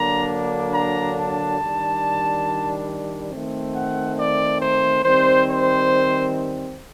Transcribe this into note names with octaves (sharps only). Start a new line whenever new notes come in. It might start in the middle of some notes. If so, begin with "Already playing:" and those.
Already playing: D3 F#3 A#3 D4 A#5
A#5
A5
D#3 G3 D4
D#3 A3 C4
F#5
D5
C5
D#3 G3 C4 C5
C5